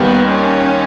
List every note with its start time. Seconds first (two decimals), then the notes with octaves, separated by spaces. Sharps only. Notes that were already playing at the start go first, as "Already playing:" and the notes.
Already playing: D#2 D#3 G3 B3
0.29 C#4